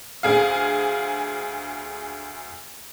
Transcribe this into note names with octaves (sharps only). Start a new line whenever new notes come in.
D2 G#4 F5